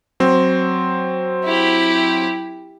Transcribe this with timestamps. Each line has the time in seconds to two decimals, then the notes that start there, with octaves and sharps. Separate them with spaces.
0.20 F#3 C4
1.44 E4 G4